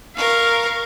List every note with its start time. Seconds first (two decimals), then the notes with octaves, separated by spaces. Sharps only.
0.16 A#4 F5 C#6